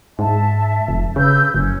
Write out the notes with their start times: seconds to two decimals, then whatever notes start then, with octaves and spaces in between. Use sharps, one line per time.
0.19 G#2 E5 A5
0.88 F1
1.16 C#3 B4 E6 G6
1.54 F#1 C#4